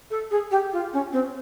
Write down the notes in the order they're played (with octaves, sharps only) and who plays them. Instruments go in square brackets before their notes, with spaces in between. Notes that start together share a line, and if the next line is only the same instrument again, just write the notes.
[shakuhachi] A4
G#4
G4
F4
C#4
C4